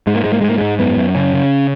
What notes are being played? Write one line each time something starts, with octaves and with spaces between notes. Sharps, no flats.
G#2 G#3
A#3
G#2 G#3
A#3
G#2 G#3
A#3
G#2 G#3
F#2 B3
F#2
C#3 C#4
C#3